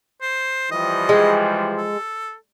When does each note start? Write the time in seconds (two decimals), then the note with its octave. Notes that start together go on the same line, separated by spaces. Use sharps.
0.22 C5
0.71 E3 F3 G3 D#5
1.09 G#3
1.78 A4